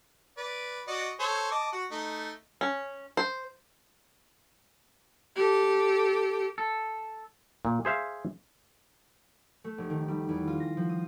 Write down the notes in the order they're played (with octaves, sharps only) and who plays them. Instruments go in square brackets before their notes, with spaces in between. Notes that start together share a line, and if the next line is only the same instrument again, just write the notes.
[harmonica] B4 D5
F#4 D5 D#5
A4 C5 C#5
D#5 A5 D6
F#4
A3 D#4
[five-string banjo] C#4
C5
[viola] G4 A4
[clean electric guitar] A4
[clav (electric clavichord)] A#2
G#4 C5 E5 F5
[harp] A3
F1
D#3
G3
E2
F4
A#6
F3
D#6